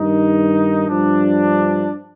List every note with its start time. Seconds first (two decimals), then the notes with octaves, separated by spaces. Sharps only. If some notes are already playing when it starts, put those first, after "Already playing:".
Already playing: G2 D#3 D#4
0.88 G2 F3 D4